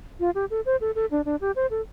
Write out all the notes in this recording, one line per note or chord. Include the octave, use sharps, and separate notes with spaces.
F4
G4
A4
C5
A4
A4
D4
D4
G4
C5
A4